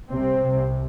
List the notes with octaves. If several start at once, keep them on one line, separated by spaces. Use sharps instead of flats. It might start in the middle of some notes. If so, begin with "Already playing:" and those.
C2 C3 C4
C2 C3